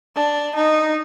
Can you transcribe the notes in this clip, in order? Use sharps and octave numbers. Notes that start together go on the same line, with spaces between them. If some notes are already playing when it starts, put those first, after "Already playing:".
D4
D#4